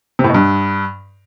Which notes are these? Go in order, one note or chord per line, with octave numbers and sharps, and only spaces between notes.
C3
A2
B2
G2